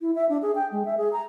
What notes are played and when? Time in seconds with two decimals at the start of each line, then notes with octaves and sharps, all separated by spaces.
0.01 E4
0.15 E5
0.29 D4
0.42 G#4
0.55 G5
0.72 G#3
0.85 E5
0.98 G#4
1.13 A#5